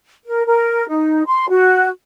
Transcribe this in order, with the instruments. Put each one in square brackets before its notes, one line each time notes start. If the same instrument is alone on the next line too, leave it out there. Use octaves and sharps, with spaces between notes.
[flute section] A#4
A#4
D#4
C6
F#4